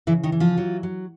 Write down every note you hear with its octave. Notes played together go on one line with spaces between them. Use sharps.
C#3 E3 E4
D#3 D#4
E3
F3 F4
F#3
F#3